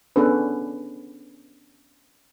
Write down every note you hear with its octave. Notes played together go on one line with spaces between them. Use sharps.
B3 C#4 D4 G#4 A4 B4